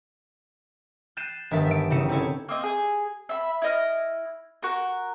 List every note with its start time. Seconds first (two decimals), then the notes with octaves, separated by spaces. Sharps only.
1.17 F#6 G6 A6 C7 D#7 E7
1.51 G1 D#3 E5 A5
1.67 E5 D7
1.90 C#3 G3 D#4 E4 C#7 E7
2.09 C4 D#4 E4 A4 C#5
2.48 A#3 C4 D#5
2.63 G#4
3.29 E5 B5
3.62 E4 D#5 F6
4.63 F#4 A#4